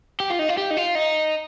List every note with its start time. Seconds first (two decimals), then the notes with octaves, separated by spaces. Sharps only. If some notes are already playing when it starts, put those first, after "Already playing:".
0.20 G4
0.30 F4
0.39 D#4
0.49 F4
0.57 G4
0.71 D#4
0.77 F4
0.95 D#4